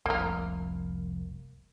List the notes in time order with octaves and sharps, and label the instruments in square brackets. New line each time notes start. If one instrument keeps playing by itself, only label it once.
[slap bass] F1 [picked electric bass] C2 [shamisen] A#3 A#4